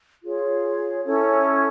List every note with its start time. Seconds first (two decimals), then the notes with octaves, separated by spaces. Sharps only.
0.23 F4 G#4 C#5
1.04 C#4 E4 A4 C#5